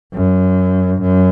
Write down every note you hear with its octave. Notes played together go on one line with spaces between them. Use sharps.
F#2
F#2